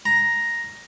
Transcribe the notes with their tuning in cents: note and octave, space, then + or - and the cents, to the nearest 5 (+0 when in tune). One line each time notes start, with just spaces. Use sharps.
A#5 +5